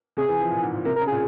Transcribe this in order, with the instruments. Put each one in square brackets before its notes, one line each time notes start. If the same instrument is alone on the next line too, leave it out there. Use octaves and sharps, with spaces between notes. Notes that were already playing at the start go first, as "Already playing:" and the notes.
[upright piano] C3 [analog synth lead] G#4
[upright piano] E3
F3
A#2
G#2
A#2
[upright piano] C3 [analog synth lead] A#4
[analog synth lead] A#4
[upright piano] C#3
[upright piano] A#2 [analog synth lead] G#4